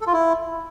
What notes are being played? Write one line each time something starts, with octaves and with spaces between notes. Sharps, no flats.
A4
F4
E4